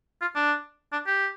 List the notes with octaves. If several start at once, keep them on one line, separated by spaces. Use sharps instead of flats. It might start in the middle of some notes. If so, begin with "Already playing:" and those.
F4
D4
D4
G4